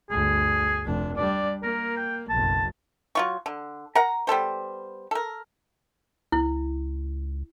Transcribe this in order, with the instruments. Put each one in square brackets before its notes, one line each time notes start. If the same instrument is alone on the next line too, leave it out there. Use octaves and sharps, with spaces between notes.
[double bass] G1 D2 [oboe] G#4
[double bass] F1 D4
[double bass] G3 D4 [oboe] D5
[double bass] A#3 [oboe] A#4
[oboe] G5
[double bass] F#1 B1 [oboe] A5
[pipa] F#3 F4 C#6
D3
A#4 F#5 A#5
G3 B3 A4 C5
A4 A#4
[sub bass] C#2 [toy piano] E4